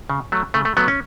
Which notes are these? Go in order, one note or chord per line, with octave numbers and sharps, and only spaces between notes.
C#3
F#3 A3
C#3 A3
A3
F#3 A3 B3
C#4